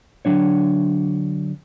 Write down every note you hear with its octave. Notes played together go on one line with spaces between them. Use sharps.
D3 F#3 D4 C#5